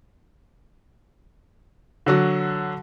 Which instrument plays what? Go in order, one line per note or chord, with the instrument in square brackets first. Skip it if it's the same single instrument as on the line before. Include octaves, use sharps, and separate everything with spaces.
[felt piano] D3 F#3 F#4